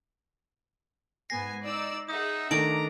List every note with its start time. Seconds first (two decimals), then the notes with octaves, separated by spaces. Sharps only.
1.30 G#2 B3 G#5 A#6 C7
1.65 D#4 D5 E6
2.09 D#4 G#4 E5 F#5 D#6
2.51 D#3 A3 D4 A#5 D6 D7 F#7